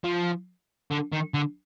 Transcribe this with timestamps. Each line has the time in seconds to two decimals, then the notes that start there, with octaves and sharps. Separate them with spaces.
0.04 F3
0.91 D3
1.13 D#3
1.34 D3